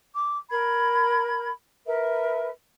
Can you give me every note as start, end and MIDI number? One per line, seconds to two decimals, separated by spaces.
0.14 0.37 86
0.50 1.50 70
0.50 1.50 83
0.50 1.50 92
1.85 2.47 70
1.85 2.47 71
1.85 2.47 76